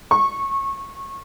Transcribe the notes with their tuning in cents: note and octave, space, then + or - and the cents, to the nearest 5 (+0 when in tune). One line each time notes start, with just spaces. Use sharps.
C#6 -20